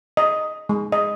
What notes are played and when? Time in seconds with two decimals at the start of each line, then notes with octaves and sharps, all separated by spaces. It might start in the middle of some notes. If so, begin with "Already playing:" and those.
0.17 D#5
0.69 G#3
0.92 D#5